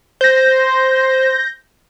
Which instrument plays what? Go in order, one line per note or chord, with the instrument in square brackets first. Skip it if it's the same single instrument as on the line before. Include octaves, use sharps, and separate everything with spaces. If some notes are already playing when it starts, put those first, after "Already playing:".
[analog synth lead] C5 [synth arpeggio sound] G6 A#6